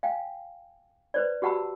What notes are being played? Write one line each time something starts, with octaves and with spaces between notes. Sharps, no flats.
F5 G5 G#5
B4 C5 D5
F#4 G4 F#5 A5 B5 E6